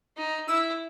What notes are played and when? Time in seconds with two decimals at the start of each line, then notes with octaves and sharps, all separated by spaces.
0.17 D#4
0.48 E4 E6